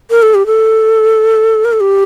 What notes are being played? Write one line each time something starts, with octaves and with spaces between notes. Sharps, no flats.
A#4
A4
G4
A4
A#4
A4
G4